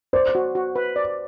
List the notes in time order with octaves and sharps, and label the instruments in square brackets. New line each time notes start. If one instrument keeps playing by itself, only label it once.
[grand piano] C5 [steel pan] D5
[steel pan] F#4
F#4
B4
D5